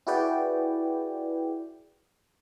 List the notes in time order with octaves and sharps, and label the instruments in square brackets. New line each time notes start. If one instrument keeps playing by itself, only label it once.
[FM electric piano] E4 F#4 G#4 B4 D5 G5